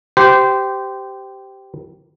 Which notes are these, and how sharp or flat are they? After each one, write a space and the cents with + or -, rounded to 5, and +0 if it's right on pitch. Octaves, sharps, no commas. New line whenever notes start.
G4 -10 C5 -20